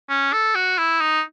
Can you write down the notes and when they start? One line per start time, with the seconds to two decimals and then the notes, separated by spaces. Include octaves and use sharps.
0.09 C#4
0.33 A4
0.55 F#4
0.78 E4
1.00 D#4